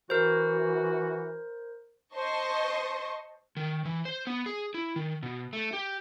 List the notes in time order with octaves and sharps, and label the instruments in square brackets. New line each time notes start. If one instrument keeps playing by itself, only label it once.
[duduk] E3 [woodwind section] F#4 [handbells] A#4 C5
[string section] C5 D#5 A5 C6 C#6
[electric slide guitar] D#3
E3
C5
B3
G#4
E4
D#3
B2
A3
G4